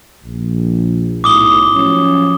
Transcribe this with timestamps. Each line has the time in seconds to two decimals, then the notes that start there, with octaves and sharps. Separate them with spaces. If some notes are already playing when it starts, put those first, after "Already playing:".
0.24 A#1
1.24 B1 A2 D6 D#6 G7
1.74 F3 F#3 C#4